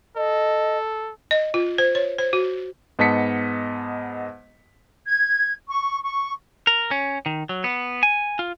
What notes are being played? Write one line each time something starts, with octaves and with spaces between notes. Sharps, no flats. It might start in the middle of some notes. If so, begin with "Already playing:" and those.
A4 D#5
D#5
F4
C5
C#5
C5
F#4
G#2 B3 D#5 A5 B6 C#7
G#6
C#6
C#6
A#4
C#4
D#3
F#3
B3
G#5
F4